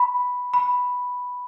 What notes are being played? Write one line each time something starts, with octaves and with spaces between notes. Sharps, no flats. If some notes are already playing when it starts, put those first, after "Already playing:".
Already playing: B5
B5